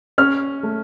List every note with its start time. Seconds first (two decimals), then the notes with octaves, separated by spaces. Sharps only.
0.18 C#4 F6
0.63 A3